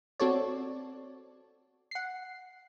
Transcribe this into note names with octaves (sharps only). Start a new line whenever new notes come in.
C4 F#4 A4 C#5 D5
F#5 C7